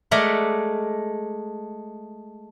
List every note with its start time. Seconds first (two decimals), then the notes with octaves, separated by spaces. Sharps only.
0.11 G#3 A3 A#4 D5 E5 F#5